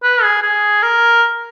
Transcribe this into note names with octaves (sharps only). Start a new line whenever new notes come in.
B4
G#4
G#4
A#4